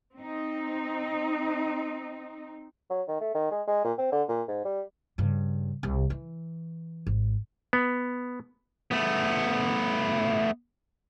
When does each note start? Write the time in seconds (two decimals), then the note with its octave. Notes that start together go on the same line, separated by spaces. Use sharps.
0.14 C4 D#4
2.90 F#3
3.08 D#3
3.21 A3
3.34 D#3
3.51 G#3
3.67 G#3
3.84 A#2
3.98 C4
4.12 D3
4.28 A#2
4.48 G#2
4.65 G3
5.18 G2 C#3
5.83 C2 C3
6.10 E3
7.07 G#1
7.73 B3
8.91 A3 B3